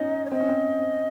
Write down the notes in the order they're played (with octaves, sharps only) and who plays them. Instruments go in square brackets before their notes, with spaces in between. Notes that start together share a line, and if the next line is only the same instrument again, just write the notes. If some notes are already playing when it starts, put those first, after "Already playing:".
Already playing: [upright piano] C#4 D#4 [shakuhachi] D#5
[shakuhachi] C#5
[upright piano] C4 [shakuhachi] D#5
[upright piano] C#4
C4
C4